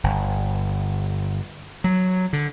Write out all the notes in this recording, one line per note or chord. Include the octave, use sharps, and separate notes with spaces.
G1
F#3
D3